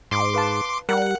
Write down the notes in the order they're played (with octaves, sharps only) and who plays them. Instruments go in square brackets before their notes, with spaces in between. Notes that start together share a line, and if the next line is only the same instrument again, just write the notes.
[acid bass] G#2 [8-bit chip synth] C6 D6
[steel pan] B4 F5 A5
[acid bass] G3 [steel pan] A#4 [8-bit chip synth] F#5